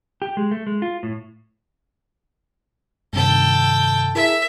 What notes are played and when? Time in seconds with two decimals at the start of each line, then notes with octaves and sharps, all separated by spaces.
0.22 G4
0.37 G#3
0.51 A3
0.67 G#3
0.82 F4
1.03 A2
3.13 G2 C3 D#3 A4 G5
4.15 E4 G#4 A#4 E5